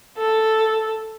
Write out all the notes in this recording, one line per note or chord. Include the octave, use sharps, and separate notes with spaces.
A4